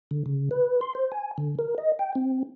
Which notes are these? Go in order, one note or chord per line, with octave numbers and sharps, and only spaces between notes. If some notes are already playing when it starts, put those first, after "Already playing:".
D3
C#3
B4
C6
C5
G#5
D3
A#4
D#5
G5
C4